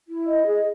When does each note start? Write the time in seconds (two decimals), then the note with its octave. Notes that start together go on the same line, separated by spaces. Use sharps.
0.09 E4
0.27 D#5
0.47 G#4